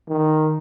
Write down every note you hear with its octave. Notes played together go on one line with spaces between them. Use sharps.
D#3